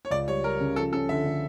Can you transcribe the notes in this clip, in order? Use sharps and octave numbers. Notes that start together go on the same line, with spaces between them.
C#5
C#2 D5
G3 C#5
G3 A#4
C#3
F3 A4
C#4 A4
D3 E5
D3